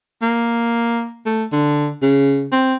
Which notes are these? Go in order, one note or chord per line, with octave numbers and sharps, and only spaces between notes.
A#3
A3
D3
C#3
C4